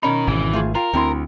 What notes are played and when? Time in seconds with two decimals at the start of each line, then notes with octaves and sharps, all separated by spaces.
0.03 B2 C#4 D#4 A#4 B5
0.27 G#1 E3
0.53 A3 F4 G#4
0.75 F4 A#4 F5 G5
0.93 D2 C4 E4 C6